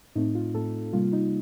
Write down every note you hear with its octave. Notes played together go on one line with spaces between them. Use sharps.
A2 A3 C4 D#4
F4
A2 A3 C4 A4
C3 G3 A#3 F4
D#4